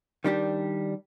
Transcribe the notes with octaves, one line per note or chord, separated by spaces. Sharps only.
D#3 G3 D4 G4